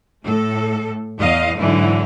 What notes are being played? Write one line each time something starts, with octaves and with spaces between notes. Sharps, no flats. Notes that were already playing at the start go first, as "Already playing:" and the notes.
A2 A3 A4
E2 D#5 F5
G#2 D3 E3 F#3 E4